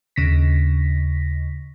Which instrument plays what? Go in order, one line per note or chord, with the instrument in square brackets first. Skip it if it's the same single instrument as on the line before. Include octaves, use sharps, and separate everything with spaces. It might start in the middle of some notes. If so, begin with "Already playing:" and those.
[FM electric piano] D#2 C#3 A#6 B6